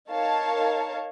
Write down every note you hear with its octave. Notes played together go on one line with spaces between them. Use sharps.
D#4 A#4 C#5 F5 A5